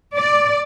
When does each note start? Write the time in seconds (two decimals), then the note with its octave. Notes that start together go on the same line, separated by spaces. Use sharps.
0.17 D5